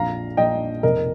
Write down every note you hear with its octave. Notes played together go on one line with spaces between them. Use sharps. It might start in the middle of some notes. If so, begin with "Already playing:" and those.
Already playing: A#1 F2 F5 A#5
A#1 D#5 G5
F1 A#4 D#5